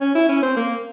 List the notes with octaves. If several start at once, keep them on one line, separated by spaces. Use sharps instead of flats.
C#4
E4
C#4
C4
A#3